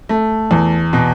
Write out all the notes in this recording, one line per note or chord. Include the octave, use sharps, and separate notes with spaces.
A3
E2
B2